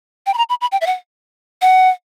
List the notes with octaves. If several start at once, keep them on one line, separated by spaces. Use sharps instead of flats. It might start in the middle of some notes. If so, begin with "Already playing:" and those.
G5
B5
A#5
B5
B5
G5
E5
F#5
F#5